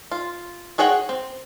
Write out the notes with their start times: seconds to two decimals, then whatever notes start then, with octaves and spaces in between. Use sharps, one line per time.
0.12 F4
0.78 F#4 G#4 C#5 F#5 G5
1.09 C4